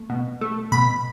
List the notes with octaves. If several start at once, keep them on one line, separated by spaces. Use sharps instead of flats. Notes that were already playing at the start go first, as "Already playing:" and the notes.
Already playing: A3
B2
A3
B2 B5